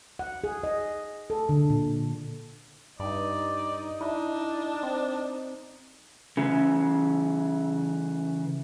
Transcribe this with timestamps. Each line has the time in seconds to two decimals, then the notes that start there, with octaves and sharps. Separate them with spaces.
0.19 F#5
0.44 G#4
0.63 D#5
1.30 A4
1.49 D3
1.70 A#2
3.00 G2 D#4 D5
4.01 D4 E4
4.83 C4
6.37 C#3 E3